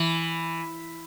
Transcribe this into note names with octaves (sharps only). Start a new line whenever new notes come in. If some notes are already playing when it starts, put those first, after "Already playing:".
Already playing: E3